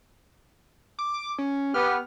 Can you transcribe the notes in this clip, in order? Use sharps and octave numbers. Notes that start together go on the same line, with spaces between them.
D6
C#4
B3 G4 F6